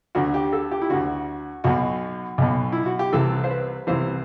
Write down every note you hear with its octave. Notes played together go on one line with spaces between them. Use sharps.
D2 D3 F#4
G4
A4
G4
E4
D2 D3 F#4
B1 B2 F#4
B1 B2
E4
F#4
G4
C2 C3 E3 A4
C5
B4
C2 C3 E3 C5